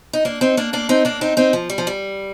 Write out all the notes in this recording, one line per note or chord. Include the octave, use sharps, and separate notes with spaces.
D#4
A#3 D4
C4 D#4
A#3 D4
A#3 D4
C4 D#4
A#3 D4
C4 D#4
C4 D#4
F3
G3
F3
G3